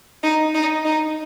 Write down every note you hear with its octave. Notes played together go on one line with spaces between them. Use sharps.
D#4
D#4
D#4